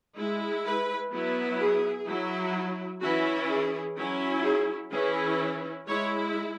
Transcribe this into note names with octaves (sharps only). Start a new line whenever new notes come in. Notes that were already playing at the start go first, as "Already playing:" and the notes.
G#3 E4
B4
F#3 B3 E4
G#4
F#3 E4
E3 C#4 E4 F#4
G#4
F#3 C#4 E4
G#4
E3 C#4 E4 G#4
G#3 E4 C#5